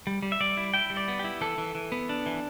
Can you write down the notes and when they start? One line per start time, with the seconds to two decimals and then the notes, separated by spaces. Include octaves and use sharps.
0.07 G3
0.22 G3
0.32 E5
0.40 G3 D5
0.57 E4
0.74 E4 G5
0.90 G3
0.97 D5
1.08 B3
1.19 E4 G4
1.41 E3 A4
1.58 E3
1.75 E3
1.92 B3
2.09 D4
2.26 E3